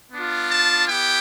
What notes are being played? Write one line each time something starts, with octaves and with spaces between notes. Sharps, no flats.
B3 D4 F4
A5
B3 E4 G4 G5